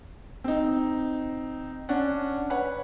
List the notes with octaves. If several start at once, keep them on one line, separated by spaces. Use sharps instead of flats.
C4 D#4
C#4 D4 F#5
B4 C#5 F#5